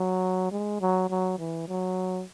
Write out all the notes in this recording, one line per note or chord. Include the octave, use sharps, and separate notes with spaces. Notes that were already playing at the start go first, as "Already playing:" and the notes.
Already playing: F#3
G#3
F#3
F#3
E3
F#3